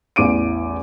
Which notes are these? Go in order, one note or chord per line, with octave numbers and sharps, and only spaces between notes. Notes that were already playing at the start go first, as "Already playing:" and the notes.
A1 E2 D6 D7 D#7